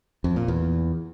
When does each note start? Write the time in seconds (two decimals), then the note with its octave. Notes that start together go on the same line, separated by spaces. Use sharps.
0.24 F2
0.36 A#2
0.48 E2